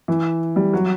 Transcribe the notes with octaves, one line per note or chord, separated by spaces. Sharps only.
E3
G3
F#3